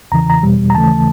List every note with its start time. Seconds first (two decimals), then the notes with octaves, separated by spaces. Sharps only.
0.12 E2 C#3 E3 A#5
0.30 A#5
0.43 E2 B2 G3
0.70 A#5
0.75 D#2 C#3 E3 A3 A5